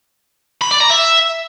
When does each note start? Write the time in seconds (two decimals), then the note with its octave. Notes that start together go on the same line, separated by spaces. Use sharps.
0.61 B5
0.71 D5
0.80 A#5
0.90 E5